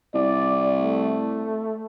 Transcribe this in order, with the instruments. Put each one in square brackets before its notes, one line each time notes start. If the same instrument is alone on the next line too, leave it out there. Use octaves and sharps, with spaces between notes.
[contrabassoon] C2 [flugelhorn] D5
[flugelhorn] A3